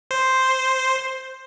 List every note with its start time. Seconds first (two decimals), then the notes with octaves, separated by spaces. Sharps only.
0.11 C5